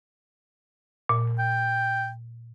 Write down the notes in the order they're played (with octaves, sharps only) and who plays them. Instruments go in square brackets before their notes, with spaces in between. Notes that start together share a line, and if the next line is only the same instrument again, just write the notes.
[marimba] A#2
[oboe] G5